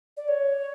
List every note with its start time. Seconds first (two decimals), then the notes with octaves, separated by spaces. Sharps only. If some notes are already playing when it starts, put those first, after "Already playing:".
0.17 D5
0.28 C#5